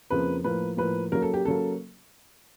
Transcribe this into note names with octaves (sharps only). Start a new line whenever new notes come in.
F2 C#3 F3 A#3 B4
A2 F3 A#3 B4
A2 F3 A#3 B4
C#3 F#3 A#3 A#4
A4
G4
C#3 F#3 A#3 A4